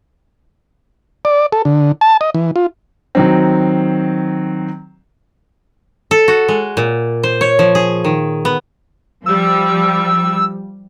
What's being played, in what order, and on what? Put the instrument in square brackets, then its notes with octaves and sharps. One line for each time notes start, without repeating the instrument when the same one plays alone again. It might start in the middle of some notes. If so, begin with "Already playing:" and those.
[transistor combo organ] D5
A4
D3
A5
D#5
E3
F4
[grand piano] D#3 F#3 C4
[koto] A4
F#4
G#3
A#2
C5
C#5
F3
G#4
D#3
B3
[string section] F3 G3 [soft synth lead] E6